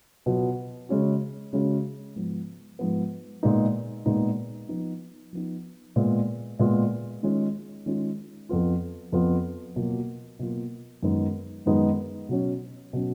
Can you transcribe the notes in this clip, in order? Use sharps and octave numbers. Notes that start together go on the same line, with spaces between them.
B2 F#3 B3 F4
C#3 G#3 C#4 F#4
C#3 G#3 C#4 F#4
G#2 F3 B3
G#2 F3 B3
A#2 G#3 B3 D#4
A#2 G#3 B3 D#4
F3 B3 D#4
F3 B3 D#4
A#2 G#3 B3 F4
A#2 G#3 B3 F4
D#3 G#3 C#4 F4
D#3 G#3 C#4 F4
F2 F3 B3 F4
F2 F3 B3 F4
B2 F#3 A#3 F4
B2 F#3 A#3 F4
F#2 D#3 G#3 B3 D#4
F#2 D#3 G#3 B3 D#4
B2 F#3 C#4
B2 F#3 C#4